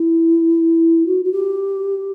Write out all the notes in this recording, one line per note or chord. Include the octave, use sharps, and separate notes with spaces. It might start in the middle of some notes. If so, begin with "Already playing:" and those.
Already playing: E4
F#4
F#4
G4